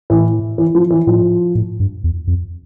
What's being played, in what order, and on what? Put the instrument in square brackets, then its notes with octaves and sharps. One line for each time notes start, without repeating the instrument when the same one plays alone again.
[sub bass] A2 [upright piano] E3
[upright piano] E3
F3
E3
[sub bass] A2 [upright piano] F3
[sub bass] A2
G2
E2
F2